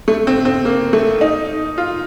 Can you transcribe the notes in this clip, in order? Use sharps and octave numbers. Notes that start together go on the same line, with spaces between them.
A3
C4
C4
A#3
A3
D#4
F4